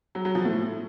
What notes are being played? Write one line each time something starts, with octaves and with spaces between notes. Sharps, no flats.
F#3
F#3
F3
A2